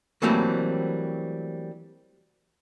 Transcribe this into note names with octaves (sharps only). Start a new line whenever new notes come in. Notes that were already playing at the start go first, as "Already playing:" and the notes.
E3 F#3 G3 A3 A#3 C4